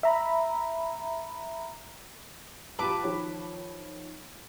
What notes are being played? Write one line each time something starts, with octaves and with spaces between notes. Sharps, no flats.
E5 A#5 B5
A#1 F4 G4 B4 A5 D6
D#3 F3 C#5